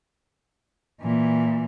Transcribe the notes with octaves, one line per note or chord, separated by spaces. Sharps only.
A#2 E3